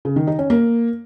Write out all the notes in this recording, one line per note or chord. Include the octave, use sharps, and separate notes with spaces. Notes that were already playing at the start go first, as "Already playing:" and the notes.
C#3
D#3
D#4
C#4
A#3